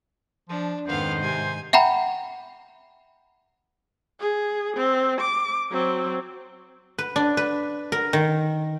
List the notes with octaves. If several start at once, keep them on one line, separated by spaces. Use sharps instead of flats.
F3 D4
F2 G#2 D#3 B3 C5 F5
C3 G#5
E5 F#5 G5 A#5 B5
G#4
C4
D6
F#3 C4
B4
D4
B4
A#4
D#3